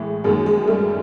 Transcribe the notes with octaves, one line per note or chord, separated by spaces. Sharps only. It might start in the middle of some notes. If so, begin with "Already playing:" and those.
Already playing: A2 E3 G#3
F#2 D#3 G#3 A#3
G#3
G3 A3